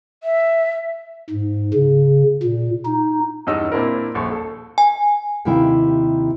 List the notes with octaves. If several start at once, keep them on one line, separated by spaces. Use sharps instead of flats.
E5
G#2
C#3
A#2
D#4
E2 G2 C#4 D#4 D#5 E6
A#2 C4 D4 E4 A#4
D#1 A#1 C#6
A4
G#5
D#2 C3 D#3 E4 F5 G5